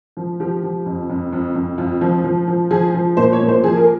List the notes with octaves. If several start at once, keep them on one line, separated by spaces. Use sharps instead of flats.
F3
F3 G4
F3
F2
F2
F2
F2
F2 F4
F3
F3
F3
F3 G#4
F3
A#2 C5
C#5
A#2
C5
F3 G#4
A#4